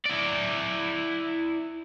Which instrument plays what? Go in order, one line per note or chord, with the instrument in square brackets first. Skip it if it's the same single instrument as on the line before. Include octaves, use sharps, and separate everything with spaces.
[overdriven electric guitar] E4 D5